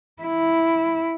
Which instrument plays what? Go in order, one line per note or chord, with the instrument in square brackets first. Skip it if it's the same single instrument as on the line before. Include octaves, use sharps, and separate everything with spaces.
[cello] E4